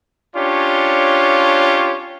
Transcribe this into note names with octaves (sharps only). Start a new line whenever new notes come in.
C#4 D4 F4 G4 C#5